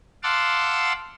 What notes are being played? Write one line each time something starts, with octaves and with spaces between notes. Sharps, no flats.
F5 F#5 A5 C6 D6 E6